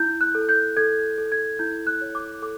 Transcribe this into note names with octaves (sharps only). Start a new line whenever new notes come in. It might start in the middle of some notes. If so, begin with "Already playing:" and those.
Already playing: E4 G6
F#6
A4
G6
A4 G#6
A4
G#6
E4 G6
F#6
C#5
D6
A4 D6